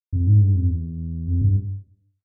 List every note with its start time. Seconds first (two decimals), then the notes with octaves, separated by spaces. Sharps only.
0.13 F2
0.27 G#2
0.41 G2
0.55 F2
0.70 E2
1.27 F2
1.41 G2